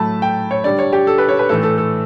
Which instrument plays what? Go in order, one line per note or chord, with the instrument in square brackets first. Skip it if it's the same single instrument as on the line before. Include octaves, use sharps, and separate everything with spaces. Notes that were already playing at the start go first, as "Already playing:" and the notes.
Already playing: [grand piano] A2 F#3 A3 A5 B5
G5
C#5
D3 G3 D5
C#5
G4
A4
B4
C#5
B4
A2 E3 A3 A4
A4
A4